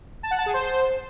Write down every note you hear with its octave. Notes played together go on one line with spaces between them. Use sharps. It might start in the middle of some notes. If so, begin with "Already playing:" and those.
A5
F#5
A5
G#4
C5